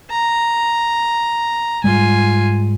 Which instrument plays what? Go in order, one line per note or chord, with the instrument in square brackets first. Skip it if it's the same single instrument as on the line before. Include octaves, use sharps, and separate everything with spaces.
[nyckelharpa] A#5
[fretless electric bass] G#2 G3 G#3 [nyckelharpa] F4 G#5